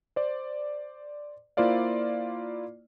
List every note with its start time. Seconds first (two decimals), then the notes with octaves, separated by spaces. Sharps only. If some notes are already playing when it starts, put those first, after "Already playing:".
0.16 C5 D5
1.57 A#3 E4 F4 C5 D5 F5